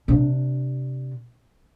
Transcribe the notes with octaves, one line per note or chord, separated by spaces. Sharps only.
C3 D4